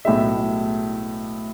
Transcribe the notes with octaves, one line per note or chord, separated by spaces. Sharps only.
B1 A2 G#3 E5